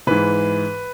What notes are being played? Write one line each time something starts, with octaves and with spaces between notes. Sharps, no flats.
G#2 E3 B4